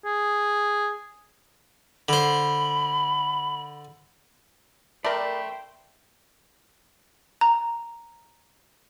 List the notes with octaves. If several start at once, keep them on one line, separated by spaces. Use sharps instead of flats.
G#4
D3 C5 B5
A3 A#4 C5 D5 G5 B5
A#5